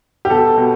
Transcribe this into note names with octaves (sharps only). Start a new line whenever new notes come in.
G4
B2 A4
B2